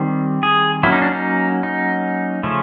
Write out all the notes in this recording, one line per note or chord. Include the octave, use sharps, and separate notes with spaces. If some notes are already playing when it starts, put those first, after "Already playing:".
Already playing: D#3 G3 C4
G#4
F#3 A#3 C#4 E4
D#4
D4
D#4
D#4
C#3 F3 A3 C#4